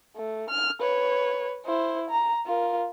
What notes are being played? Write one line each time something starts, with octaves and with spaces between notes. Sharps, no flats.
A3
F6
B4 C#5
E4 C5
A#5
F4 A#4